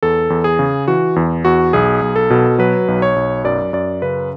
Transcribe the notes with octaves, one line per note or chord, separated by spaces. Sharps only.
E2 A4
E2
G#4
C#3
E3 F#4
E2
E2 F#4
B1 G#4
B1
A4
B2
F#3 B4
B1
C#5
B1
F#2 D5
F#2 D5
C#3 B4